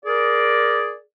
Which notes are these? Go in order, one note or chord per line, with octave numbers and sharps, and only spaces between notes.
G#4 A#4 D5